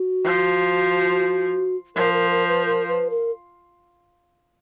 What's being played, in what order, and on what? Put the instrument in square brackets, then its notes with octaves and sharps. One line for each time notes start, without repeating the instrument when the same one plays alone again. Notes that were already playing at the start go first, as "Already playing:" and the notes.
Already playing: [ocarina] F#4
[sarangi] F3
[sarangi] F3 [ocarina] A#4
[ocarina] A#4
A#4
B4
A#4
B4
A#4